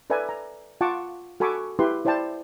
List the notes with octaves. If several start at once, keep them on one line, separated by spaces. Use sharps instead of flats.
A4 B4 D5 E5 G#5 A#5
A#5
F4 F#5 A5 C#6 D6
F#4 A4 G#5 B5 C#6 D6
E4 G4 B4 C6
E4 C5 D5 G5 A5